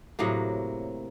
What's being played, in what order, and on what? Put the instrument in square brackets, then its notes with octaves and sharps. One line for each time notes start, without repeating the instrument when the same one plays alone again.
[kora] A2 C3 F#3 A#3